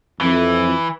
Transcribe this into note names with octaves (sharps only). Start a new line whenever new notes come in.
F2 E3